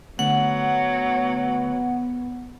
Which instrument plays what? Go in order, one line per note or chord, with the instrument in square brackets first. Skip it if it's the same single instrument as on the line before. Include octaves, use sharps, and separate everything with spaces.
[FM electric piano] D3 A3 [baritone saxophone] F#3 [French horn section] B3 [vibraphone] F#5